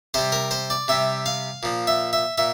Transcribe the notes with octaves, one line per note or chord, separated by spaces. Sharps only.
C3 G3 C5
A#4
C5
D5
C3 G3 E5
F5
A#2 F3
E5
E5
A#2 E5